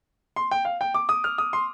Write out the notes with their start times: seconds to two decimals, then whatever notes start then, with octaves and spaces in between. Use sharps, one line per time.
0.36 C6
0.51 G5
0.65 F5
0.81 G5
0.94 D6
1.09 D#6
1.24 F6
1.38 D#6
1.53 C6